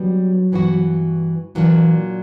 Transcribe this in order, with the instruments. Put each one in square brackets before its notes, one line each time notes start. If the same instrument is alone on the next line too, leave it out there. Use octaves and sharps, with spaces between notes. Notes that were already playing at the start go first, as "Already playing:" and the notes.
Already playing: [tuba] F#3 [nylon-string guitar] G3 B3 D4
[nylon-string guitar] G2 E3 B3 F#4
[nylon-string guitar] A#2 F#3 A#3 D4 [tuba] E3